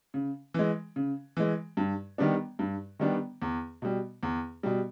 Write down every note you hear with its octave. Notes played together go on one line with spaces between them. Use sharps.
C#3
E3 G#3
C#3
E3 G#3
G2
D#3 G3 B3 D4
G2
D#3 G3 B3 D4
E2
B2 G3
E2
B2 G3